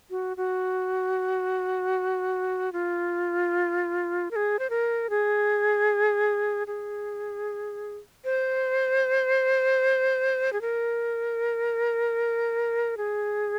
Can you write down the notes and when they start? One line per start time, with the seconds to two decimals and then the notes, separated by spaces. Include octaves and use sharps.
0.10 F#4
0.37 F#4
2.73 F4
4.31 A#4
4.36 G#4
4.59 C5
4.70 A#4
5.10 G#4
6.67 G#4
8.25 C5
10.53 G#4
10.61 A#4
12.97 G#4